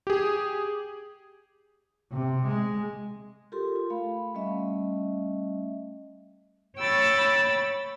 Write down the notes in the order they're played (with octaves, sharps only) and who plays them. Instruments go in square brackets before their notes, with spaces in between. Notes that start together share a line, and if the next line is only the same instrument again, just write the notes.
[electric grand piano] G4 G#4
[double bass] C3
G#3
[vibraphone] F4 G4 A4 A#4 C6
F4
A3 F5 B5
G3 A3 C#4 D#5 E5
[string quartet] C#5 G5 B5 E6 A6